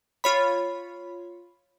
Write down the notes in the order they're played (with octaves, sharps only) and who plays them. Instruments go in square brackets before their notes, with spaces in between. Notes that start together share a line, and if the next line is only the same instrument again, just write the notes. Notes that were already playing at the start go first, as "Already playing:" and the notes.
[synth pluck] F4 C#5 B5